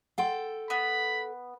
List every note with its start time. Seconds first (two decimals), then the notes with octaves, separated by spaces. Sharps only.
0.18 A4 F#5 G5 C6
0.70 B3 B5